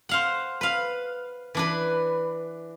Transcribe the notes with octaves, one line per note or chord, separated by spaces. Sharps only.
C5 F5 F#5
B4 F5
E3 D4 B4